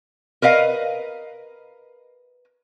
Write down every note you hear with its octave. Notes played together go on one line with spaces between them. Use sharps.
A#4 B4 D#5 F5